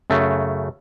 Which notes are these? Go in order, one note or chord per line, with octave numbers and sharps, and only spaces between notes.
F#2 C#3 A3